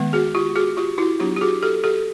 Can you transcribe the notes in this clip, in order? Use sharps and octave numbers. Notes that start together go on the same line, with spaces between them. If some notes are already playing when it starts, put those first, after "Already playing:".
Already playing: D#3 G#3 B3
F#4 G#4
F4 G4
F#4 G#4
F4 G4
E4 F#4
F#3 B3 D4 F4 G4
G4
F#4 G#4
G4 A4
G4 A4